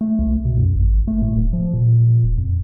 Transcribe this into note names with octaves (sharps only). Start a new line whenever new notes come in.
A3
C2
B2
F#2
G#1
A3
A2
D#1
F3
A#2
D#1
F2